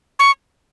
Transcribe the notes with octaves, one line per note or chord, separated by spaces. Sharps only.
C#6